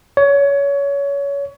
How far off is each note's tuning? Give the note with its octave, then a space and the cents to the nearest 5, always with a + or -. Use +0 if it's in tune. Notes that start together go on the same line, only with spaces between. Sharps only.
C#5 +25